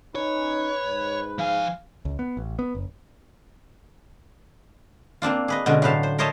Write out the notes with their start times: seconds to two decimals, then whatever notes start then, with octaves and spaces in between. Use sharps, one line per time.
0.15 C#4 D#4 B4 C#5
0.81 G#2
1.38 F3 F5 G#5
2.05 C#2
2.19 B3
2.37 A1
2.59 B3
2.75 F#1
5.22 A#3 C4 D4 F4
5.48 G#4 B4 D#5
5.66 B2 D3 G#3 C#4
5.82 A2 F#3 B4 C5 F5 A5
6.03 C5
6.18 A#4 C5 C#5 D#5 E5 A5